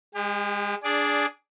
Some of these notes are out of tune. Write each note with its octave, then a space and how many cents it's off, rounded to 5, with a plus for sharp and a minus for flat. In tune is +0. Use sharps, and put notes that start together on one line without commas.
G#3 -25 G4 +35
D4 -15 G#4 +0 D5 +0